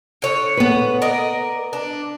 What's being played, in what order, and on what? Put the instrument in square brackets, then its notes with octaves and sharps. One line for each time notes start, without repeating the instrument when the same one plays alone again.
[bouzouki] D3 C#5
[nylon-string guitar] B3 B4
[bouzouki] A#4 D5 D#5
D4